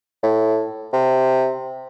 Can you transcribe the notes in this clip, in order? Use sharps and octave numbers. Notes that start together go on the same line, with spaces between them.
A2
C3